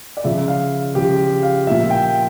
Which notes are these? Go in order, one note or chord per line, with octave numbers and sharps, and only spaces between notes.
D5
C#3 F3 E5
F5
C#3 F3 G4
F5
A#2 F3 E5
G5